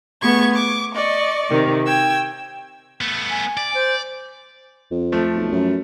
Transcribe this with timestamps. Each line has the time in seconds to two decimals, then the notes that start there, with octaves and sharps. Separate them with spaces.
0.22 A3 B3 G#4 C#6 G#6
0.55 C#6 D6
0.94 D5 D#5 C#6
1.50 C3 D#3
1.86 G5 E6 G#6
3.01 A3 B3
3.30 G#5
3.57 D5
3.74 C5
4.91 F2
5.12 F3 A3
5.35 B1
5.52 F#2